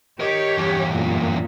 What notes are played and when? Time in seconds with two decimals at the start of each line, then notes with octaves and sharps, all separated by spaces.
0.20 G4 A#4 C#5 D#5
0.58 E2 G2
0.93 F#2 A#2